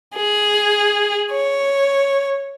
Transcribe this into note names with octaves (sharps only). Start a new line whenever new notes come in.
G#4
C#5